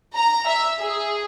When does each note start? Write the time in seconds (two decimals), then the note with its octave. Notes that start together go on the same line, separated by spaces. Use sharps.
0.15 A#5
0.47 E5
0.81 G#4